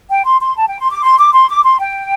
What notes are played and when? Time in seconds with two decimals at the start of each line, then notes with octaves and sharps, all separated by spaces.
0.09 G5
0.25 C6
0.40 C6
0.56 A5
0.68 G5
0.79 C6
0.91 D6
1.02 C6
1.18 D6
1.33 C6
1.48 D6
1.63 C6
1.79 G5